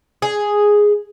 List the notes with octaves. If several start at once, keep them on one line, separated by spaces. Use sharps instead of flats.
G#4